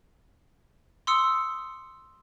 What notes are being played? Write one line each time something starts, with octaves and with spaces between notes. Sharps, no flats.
C6 D#6 E6 C#7